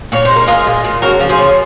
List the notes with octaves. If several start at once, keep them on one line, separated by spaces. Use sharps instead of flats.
A#2 C#5
G#3 C5
A#4
G#3 F4 G#4
A#2
A#2
C#3 F#4 A#4
F3
G#4 C5
C#3